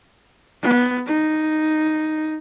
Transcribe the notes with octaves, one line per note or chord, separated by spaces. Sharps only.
B3
D#4